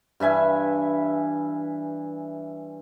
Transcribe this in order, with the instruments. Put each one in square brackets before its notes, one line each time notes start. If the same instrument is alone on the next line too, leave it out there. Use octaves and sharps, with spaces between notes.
[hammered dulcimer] G2 E3 E5 G#5